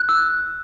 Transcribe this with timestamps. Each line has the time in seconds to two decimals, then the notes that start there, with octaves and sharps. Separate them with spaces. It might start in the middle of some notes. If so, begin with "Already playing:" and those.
Already playing: F#6
0.09 E6